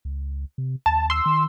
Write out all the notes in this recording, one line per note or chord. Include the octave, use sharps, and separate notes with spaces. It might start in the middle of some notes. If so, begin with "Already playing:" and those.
C#2
C3
D#2 A5
C6 E6
D#3